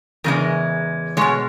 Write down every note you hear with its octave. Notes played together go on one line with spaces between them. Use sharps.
E2 C#3 G#3 A#4
B2 G#3 C#5